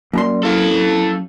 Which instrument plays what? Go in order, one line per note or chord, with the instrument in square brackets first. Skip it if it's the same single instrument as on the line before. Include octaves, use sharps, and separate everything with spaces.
[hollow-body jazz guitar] F#2 A#5 C6 [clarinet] G3 [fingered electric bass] A#3
[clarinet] E4 [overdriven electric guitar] A4 F5